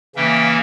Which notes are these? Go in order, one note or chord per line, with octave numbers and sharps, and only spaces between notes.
C#3 E3 A#3 C#4 E5 G5